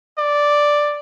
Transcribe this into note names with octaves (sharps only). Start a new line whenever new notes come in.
D5